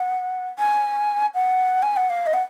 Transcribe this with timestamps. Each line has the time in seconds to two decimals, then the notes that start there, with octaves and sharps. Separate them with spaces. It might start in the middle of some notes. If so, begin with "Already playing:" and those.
Already playing: F#5
0.59 G#5
1.35 F#5
1.83 G#5
1.97 F#5
2.10 F5
2.26 D#5
2.34 F#5